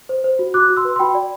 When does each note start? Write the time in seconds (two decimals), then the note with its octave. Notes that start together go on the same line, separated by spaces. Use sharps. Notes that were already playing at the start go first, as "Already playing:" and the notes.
0.09 C5
0.24 C5
0.39 F#4
0.54 F#4 D6 F#6
0.70 F#4
0.77 C6 E6
0.85 B4
0.96 C6
0.99 F#4 G5 B5
1.15 D5